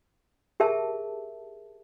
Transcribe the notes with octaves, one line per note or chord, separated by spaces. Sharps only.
G4 G#4 A#4 E5 A5